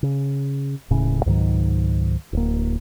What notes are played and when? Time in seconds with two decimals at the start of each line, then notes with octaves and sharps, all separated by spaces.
0.03 C#3
0.90 D#1 A2 C#3 C#4
1.26 C#2 G#2 D#3 F#3
2.33 D1 A#3